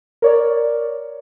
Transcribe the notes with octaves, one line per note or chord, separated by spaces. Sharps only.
A#4 C#5 D5